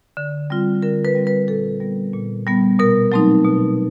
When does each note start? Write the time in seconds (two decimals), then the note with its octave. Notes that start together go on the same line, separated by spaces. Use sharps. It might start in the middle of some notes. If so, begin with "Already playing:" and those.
0.17 D3
0.50 G3 C4 F4
0.82 D3 A#4
1.05 B4
1.15 G3 C4 F4
1.27 B4
1.47 A#2 A4
1.80 G3 B3
2.13 A#2
2.47 G3 B3
2.79 B2 A#4
3.12 F#3 A3 C4 D#4
3.45 B2